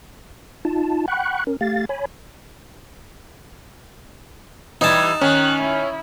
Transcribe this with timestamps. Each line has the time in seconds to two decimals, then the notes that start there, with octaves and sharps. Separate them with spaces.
0.65 D#4 F4 A5
1.08 F#5 G5 B5 C#6 F#6
1.47 C#4 A#4
1.61 A3 G4 F5 A6
1.89 C#5 G#5 B5
4.81 E3 G3 D#4 A5
5.21 D#3 C#4 F#6
5.60 E4